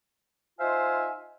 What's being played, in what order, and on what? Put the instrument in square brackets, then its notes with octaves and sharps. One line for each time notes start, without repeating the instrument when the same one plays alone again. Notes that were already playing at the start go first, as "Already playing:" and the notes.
[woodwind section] D#4 F4 C5 E5 F5 G#5